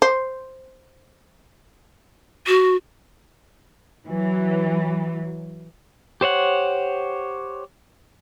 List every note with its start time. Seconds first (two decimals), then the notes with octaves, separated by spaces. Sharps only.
0.02 C5
2.47 F#4
4.07 E3 F#3
6.21 G4 C5 C#5 F#5